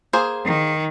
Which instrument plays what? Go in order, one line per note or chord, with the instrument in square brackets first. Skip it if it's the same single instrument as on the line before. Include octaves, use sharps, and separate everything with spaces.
[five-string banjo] A#3 G#4 C5
[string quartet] D#3